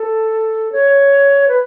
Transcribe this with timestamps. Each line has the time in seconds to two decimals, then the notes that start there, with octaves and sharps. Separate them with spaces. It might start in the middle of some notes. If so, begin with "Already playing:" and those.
Already playing: A4
0.72 C#5
1.48 B4